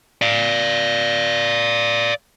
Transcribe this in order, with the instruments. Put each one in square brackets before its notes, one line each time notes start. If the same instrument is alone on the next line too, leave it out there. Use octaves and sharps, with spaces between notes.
[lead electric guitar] D5 F5